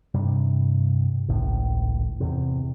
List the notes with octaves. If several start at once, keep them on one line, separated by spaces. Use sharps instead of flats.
G2 C3 G3
G#1 C#2 A2
E2 C3